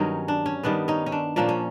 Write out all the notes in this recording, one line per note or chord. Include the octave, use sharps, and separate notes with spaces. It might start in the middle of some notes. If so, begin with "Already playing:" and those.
Already playing: G2 D#3 F#3 B3 C#4 D#4
D4
C#4
D#3 G3 B3 D4
C#4 D#4
C#4
D4
A#2 F3 A#3 C#4 D4
C#4